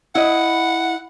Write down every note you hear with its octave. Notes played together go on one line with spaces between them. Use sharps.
E4 D#5 F#5